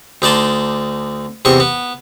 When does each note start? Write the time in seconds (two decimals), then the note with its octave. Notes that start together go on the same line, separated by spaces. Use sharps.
0.22 D2 D#4 D5 A5 C6
1.45 E2 C3 D#5 C#6
1.60 B3